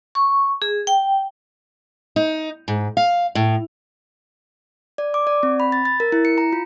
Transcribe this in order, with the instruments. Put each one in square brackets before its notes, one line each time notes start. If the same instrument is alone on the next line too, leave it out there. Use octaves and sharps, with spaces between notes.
[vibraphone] C#6
G#4
G5
[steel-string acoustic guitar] D#4
G#2
F5
A2
[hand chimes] D5
D6
D5
C4
B5
A6
A6
A#4
E4
C#7
A#5
F4